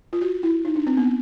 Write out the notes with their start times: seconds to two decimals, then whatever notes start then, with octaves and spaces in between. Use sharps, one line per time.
0.13 F4
0.21 F#4
0.43 E4
0.65 D#4
0.76 D4
0.87 C4
0.97 B3